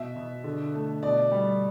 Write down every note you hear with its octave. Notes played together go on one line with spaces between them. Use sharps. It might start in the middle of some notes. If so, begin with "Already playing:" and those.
Already playing: B2 E5
B2
D3
A3
B2 D5
G3